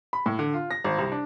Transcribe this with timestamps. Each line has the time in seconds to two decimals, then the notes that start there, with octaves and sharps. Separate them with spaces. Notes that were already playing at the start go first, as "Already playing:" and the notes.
0.13 B5
0.26 A2
0.39 D3
0.54 F4
0.71 A#6
0.84 G#1
0.98 C2
1.12 D4